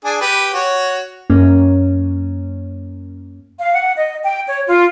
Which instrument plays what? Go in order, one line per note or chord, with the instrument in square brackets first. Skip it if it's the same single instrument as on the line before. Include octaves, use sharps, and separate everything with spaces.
[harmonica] D4 G#4 G#5
G4 B4
F#4 C#5
[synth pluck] F#2 A#3 C#4
[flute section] F5
F#5
D#5
G5
C#5
F4